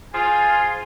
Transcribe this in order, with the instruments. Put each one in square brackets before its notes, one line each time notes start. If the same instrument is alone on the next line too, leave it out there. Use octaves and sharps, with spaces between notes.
[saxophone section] F4 [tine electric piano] G#4 C5 [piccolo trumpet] G#5